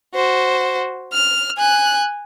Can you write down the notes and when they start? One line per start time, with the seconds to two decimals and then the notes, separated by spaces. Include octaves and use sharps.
0.15 F#4 C5
1.13 F6
1.58 G#5 F#6